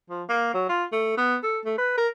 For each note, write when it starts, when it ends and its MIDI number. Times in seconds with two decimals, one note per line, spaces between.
0.10 0.23 53
0.29 0.53 58
0.54 0.68 54
0.69 0.84 65
0.92 1.17 57
1.17 1.36 59
1.43 1.59 69
1.65 1.76 57
1.78 1.96 71
1.98 2.08 70